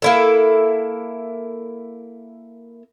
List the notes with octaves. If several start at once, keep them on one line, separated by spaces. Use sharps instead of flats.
A#3 E4 A4